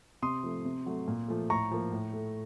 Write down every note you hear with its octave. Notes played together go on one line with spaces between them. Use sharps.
C3 C6 D#6
F3 A3
C3
F#3 A3
A#2
F3 A3
A2 A#5 C#6
F3 A#3
A2
A3